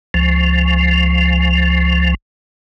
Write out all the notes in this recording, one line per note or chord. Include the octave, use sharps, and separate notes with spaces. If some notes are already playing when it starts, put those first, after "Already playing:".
C#2 F3